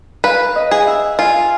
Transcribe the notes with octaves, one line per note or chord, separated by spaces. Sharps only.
B4 F5
D#5
G#4
E5
F4 G#5